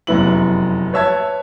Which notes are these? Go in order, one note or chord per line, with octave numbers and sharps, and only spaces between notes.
F1 F#2 B3 E4 F#7
B4 C#5 E5 A5 G#6